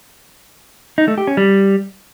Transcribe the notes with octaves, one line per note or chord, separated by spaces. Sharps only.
D#4
A3
G4
C#4
G3